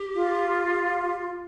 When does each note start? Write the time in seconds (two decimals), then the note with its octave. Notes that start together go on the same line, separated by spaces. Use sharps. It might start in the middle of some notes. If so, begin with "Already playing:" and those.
Already playing: G4
0.15 F4